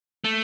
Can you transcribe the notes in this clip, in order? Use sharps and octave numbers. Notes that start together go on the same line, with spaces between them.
A3